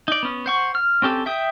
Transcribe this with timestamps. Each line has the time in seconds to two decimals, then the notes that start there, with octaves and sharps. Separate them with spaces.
0.08 D#4 D5
0.23 B3 C#4
0.46 C5 F#5 C#6
0.75 F6
1.02 C4 C#4 G4 A4
1.26 E5 G5 D#6